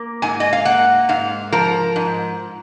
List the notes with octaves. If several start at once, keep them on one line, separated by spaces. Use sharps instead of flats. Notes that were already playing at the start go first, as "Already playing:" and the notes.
Already playing: A#3
G#2 G#5
D#5
F5
A#3 F#5
G#2 F5
F3 A#4
G#2